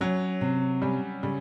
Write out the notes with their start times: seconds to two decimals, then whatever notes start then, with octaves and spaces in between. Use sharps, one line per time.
0.01 F#3 C#4
0.41 C3
0.82 G3 C#4
1.23 C#3 G3